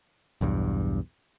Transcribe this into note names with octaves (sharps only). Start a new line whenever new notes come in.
B1 E2 G2